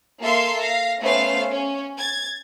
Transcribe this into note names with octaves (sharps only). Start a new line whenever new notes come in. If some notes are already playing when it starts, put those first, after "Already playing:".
A#3 A4 E5 F5 C6
F5 A#6
A3 B3 C#4 C5 F5
C#4
G#6 A6